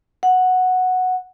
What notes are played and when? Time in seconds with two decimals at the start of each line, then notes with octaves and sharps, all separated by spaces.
0.23 F#5